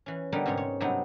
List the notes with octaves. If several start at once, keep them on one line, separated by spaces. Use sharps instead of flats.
E3 C#4
D3 G3 B3 D#4 A4 A#4
G#2 C3 C#4 D#4 C#5
C#5
G2 C3 F#3 B3 D#4 E4